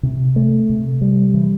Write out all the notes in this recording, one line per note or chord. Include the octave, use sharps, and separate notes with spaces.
C3
A3
C3
G3
E3